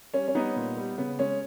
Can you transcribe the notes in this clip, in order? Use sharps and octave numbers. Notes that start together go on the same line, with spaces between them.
G3 C#4
C#4
G3 B3 D#4
A#2
G3
C#3 B3
G#3 C#4